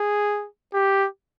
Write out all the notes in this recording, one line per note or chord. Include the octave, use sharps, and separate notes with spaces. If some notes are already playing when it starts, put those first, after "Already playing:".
Already playing: G#4
G4